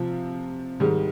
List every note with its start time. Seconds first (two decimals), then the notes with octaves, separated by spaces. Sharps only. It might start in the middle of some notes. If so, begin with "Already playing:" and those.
Already playing: C3 F3 C4 F4
0.80 G#2 D#3 G3